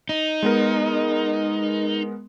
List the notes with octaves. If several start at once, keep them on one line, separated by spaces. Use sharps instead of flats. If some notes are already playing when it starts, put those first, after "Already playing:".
D#4
G#3 B3 A#4